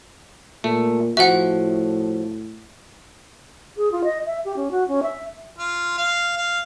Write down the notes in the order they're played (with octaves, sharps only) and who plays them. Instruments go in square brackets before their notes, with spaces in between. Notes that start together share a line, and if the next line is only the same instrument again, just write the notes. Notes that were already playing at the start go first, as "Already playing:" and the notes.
[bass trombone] A#2 [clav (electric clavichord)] A3
[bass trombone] A2 [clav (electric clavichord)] F3 F#4 [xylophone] E5 F#5
[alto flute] G#4
F4
D#5
E5
G4
C#4
F#4
C#4
E5
[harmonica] F4
F5
F5